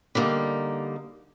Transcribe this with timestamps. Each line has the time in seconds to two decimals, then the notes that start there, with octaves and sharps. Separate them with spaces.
0.15 D3 G3 A#3 D#4